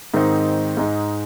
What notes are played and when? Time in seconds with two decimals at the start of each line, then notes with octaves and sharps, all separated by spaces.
0.14 G#2 D#3 C4 D#4
0.77 G#2 G#3 D#4